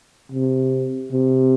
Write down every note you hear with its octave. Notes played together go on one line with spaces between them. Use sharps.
C3
C3